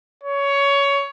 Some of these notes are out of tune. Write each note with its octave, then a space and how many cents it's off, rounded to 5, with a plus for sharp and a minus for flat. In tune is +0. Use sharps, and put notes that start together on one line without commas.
C#5 +15